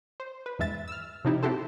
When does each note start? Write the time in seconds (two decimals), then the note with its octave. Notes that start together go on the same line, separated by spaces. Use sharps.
0.20 C5
0.46 B4
0.59 E2 G2 G#3 E5 A6
0.88 E6 F6
1.25 C3 F3 C4 D#4 E4 G4
1.43 C4 E4 F#4 G4 A4 C5